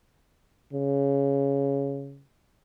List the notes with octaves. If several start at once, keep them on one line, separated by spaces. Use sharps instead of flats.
C#3